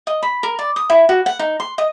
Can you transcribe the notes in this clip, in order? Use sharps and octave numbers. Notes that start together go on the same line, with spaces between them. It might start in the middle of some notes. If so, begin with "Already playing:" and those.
D#5
B5
A#4
D5
D#6
E4
F#4
F#5
D#4
C6
D#5